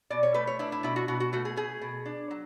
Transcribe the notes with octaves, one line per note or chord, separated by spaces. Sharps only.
B2 D5
C#5
A3 B4
C#5
D4 E4
E4
B2 E4
F#4
B2 F#4
F#4
A3 F#4
G#4
A3 G#4
B2
D4
F#3